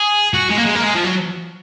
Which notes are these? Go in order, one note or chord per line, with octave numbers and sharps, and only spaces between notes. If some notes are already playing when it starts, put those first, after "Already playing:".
Already playing: G#4
F#4
G#3
A#3
G#3
A#3
G#3
F3
F#3